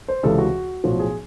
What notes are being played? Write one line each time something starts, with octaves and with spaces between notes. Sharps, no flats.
C5
C#2 C3 E3 A4
F#4
B1 A2 F3 F#4
G#4